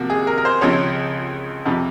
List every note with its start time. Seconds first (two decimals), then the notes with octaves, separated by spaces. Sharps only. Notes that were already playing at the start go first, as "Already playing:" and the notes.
Already playing: C3 F3 A#3 F#4
0.10 G#4
0.27 A#4
0.38 A#4
0.45 C5
0.61 C#2 C#3 F3 C4 C#5
1.66 F2 C3 F3